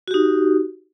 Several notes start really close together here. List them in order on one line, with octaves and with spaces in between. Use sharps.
F#4 G4 D#4